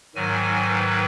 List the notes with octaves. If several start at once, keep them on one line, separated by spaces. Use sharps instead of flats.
G#2 D#3 F#3 G#5
B4